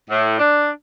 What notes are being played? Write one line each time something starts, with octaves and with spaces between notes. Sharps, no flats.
A2
D4